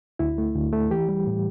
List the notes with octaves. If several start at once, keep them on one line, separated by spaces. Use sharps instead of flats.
D2 E4
A3
D2
A3
E3 G4
G3
A2